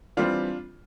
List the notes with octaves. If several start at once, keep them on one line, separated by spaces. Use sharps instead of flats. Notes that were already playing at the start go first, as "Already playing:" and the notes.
E3 G3 C4 D4 F4